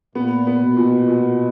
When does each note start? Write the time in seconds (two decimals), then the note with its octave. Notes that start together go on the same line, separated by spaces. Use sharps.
0.15 A#2 B3
0.47 B3
0.62 B2
0.77 A#2
1.08 A#2